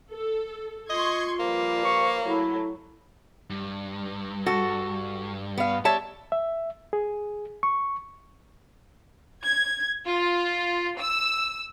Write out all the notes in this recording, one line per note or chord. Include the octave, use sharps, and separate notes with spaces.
A4
F4 D#5 C6 C#6 G#6
F3 G3 A#3 B4
C#6
F#3 A3 E4
G2
F#4 A4
B3 F5
G4 C#5 E5 A5
E5
G#4
C#6
G#6
F4
E6